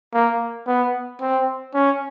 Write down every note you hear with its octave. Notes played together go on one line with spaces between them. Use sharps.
A#3
B3
C4
C#4